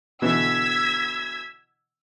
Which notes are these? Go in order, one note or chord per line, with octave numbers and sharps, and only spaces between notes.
B2 D3 E3 E6 G#6 B6